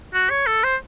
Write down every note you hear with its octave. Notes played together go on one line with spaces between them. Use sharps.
F#4
C#5
A4
C5